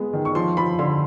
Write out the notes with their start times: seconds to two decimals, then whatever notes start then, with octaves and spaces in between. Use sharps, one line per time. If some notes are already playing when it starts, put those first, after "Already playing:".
Already playing: G#3 B3
0.13 D#3
0.25 C#6
0.35 F3 C6
0.57 F3 B5
0.79 D3 C6